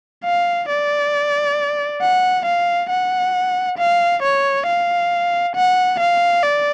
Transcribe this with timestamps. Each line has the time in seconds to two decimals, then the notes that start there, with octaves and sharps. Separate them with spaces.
0.25 F5
0.69 D5
2.02 F#5
2.45 F5
2.90 F#5
3.78 F5
4.23 C#5
4.67 F5
5.56 F#5
6.00 F5
6.43 D5